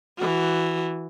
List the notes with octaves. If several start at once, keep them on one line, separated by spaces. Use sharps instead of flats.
E3 F#4